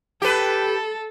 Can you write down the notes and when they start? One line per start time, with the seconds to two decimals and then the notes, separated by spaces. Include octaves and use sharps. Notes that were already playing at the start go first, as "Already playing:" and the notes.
0.22 G4 A4 B4